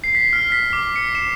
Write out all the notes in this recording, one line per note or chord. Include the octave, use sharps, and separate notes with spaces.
C7
B6
F6
B6
D6
C#7
E7